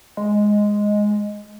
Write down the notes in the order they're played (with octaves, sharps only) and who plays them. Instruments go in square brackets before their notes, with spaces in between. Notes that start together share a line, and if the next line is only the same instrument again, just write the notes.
[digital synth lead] G#3